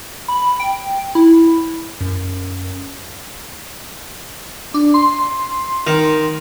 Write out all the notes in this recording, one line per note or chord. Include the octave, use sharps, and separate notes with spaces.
B5
G5
E4
F#2
D4
C6
D#3